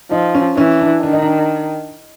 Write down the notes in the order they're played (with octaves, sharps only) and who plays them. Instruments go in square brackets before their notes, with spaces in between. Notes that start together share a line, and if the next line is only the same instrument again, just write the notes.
[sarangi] F3 [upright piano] D#4
[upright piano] C#4
[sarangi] E3 [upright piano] C#4
[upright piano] D4
[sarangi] D#3 [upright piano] D4
[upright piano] D#4
D4